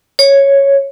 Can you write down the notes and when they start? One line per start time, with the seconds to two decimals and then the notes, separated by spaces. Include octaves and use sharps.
0.19 C#5